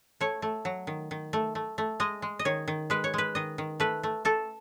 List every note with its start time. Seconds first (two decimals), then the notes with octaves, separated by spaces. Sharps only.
0.21 A3 C#5
0.42 A3
0.65 F#3
0.87 D#3
1.11 D#3
1.33 A3
1.55 A3
1.78 A3
2.00 G#3 D#5
2.22 G#3
2.39 D#5
2.45 D#3 C#5
2.68 D#3
2.90 G#3 B4
3.04 C#5
3.14 G#3 B4
3.35 D#3 D#5
3.58 D#3
3.80 A3 B4
4.03 A3
4.25 A3 A4